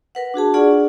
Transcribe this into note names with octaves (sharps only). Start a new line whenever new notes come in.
A#4 B4 F#5
D4 F#4 G#4 A5
D4 F4 G#4 D5 F#5 C#6